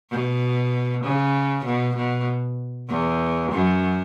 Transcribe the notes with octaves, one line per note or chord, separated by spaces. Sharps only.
B2
C#3
B2
B2
E2
F#2